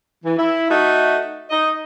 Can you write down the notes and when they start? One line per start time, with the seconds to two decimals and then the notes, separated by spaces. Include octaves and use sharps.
0.25 E3
0.38 E4
0.70 A3 D#4 F#4 A4 E5
1.51 D#4 D#5